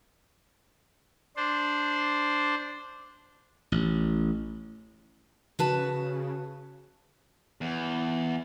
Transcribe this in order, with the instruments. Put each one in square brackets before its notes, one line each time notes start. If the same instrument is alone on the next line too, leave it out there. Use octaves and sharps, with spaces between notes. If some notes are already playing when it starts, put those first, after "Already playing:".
[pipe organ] D4 C5
[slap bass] A1
[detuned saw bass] C#3 [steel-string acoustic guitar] F#4 B4 A5
[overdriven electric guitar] E2